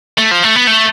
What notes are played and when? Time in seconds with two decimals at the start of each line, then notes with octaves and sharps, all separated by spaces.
0.18 A3
0.31 F3
0.44 A3
0.56 B3
0.67 A3